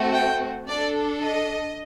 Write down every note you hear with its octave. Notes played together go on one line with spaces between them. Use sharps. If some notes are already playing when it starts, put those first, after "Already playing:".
Already playing: A3 C4 F#4
G5
D4 A4 D5
D#5